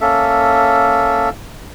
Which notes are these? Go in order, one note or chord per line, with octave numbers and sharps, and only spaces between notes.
A#3 C#4 A4 E5